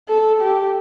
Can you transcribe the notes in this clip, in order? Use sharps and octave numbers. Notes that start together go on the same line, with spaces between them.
A4
G4